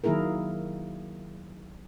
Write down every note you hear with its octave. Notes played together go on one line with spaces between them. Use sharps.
D#3 F#3 A#3 E4 G#4 A#4